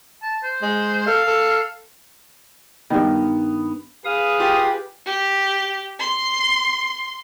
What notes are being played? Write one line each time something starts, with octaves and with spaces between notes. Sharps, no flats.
A5
C5
G#3
A4 F5
A4
G2 D#3 B3
G#4 B4 F5 D#6
F4 G4
G4
C6